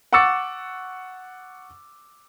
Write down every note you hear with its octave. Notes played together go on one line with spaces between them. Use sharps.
F#5 C#6 D6 E6 A6 C#7